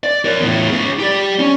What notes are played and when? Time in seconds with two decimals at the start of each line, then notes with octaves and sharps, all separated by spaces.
0.04 D5
0.25 A#4 C#5
0.40 E2 A2
0.70 F4 G#4
0.99 G4 D5
1.39 C#4